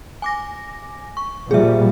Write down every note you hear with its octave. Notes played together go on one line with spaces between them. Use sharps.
G#5 D6 A#6
C#6
A#2 F3 G3 G#4 E5